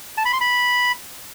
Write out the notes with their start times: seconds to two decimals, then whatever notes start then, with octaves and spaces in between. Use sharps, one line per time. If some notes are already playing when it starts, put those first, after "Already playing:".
0.18 A5
0.25 B5
0.33 C6
0.41 B5